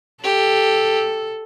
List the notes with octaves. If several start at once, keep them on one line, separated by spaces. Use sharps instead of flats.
G4 A4